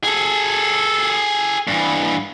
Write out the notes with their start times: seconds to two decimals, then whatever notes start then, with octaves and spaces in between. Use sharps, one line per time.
0.03 G#4 A4
1.68 G2 E3